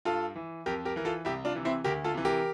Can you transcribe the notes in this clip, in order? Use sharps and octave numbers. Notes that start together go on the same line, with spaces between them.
G2 F4 A4
E3
F2 G4 A#4
G4 A#4
E3 A#4
F4 A4
C2 E4 G4
D4 F4
C3 E3
C4 E4
D2 G4 A#4
F4 A4
C3 E3
G4 A#4